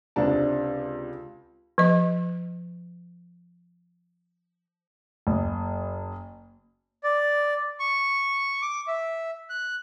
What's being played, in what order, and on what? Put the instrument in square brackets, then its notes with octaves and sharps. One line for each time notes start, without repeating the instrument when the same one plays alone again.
[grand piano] C#2 C3 D4 A5
[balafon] F3 D#5
[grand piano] F#1
[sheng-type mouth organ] D5
C#6
D6
E5
F#6